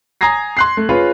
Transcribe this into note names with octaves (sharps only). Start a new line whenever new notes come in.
G#5 A#5 D#6 G#6 A#6 C7
C6 F#6 C7
A3
C#4 F4 G#4 B4 C#5